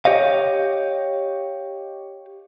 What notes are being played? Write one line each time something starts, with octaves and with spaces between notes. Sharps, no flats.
G4 C#5 D#5 F5